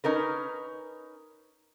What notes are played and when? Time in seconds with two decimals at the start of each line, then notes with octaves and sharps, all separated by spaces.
0.04 C#4 D#4 A#4 B4